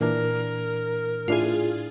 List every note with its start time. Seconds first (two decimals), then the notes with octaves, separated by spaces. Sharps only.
0.01 A#2 E3 D4 A#4
1.28 A2 D4 E4 F4 G#4